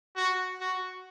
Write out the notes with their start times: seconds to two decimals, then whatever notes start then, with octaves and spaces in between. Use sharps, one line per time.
0.16 F#4
0.60 F#4